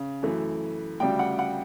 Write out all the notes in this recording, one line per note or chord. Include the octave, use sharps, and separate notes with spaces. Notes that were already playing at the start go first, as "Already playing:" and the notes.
Already playing: C#3
F#2 E3 A3
D2 C#3 G3 G5
F#5
F#5